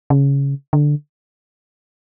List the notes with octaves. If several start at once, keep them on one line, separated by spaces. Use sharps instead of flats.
C#3
D3